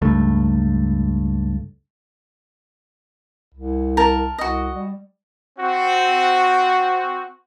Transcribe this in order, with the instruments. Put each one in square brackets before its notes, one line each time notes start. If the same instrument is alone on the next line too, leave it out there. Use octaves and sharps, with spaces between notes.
[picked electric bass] C#2 G2 A3
[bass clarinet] C2
[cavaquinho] A#4 A5
[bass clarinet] C2 [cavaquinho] F#4 D#5
[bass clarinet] G3
[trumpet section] C4 F#4